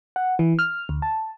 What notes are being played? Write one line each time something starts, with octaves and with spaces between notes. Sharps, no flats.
F#5
E3
F6
D2
A5